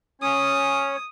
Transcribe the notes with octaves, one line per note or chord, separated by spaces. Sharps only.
C#4 C#5 D#6